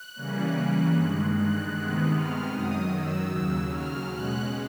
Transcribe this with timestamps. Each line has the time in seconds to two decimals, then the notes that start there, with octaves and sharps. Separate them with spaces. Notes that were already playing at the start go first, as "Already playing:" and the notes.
Already playing: F#6
0.16 C#3 E3 G3 A#3 C#4
0.94 G2 D#3 G#3
1.33 F#6
1.73 C3 D#3 G#3 B3 F#6
2.12 F6
2.51 F#2 D#3 F#3 D#6
2.92 E6
3.30 D#2 C#3 F#3
3.70 F6
4.09 B2 G#3 C#4 F#6